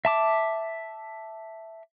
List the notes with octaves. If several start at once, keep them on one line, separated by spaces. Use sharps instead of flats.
E5 A5 D6